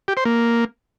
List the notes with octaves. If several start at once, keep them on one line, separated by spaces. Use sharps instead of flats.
G4
C5
A#3